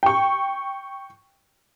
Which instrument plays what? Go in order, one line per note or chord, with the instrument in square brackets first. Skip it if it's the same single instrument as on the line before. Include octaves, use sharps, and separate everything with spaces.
[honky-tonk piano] G5 C#6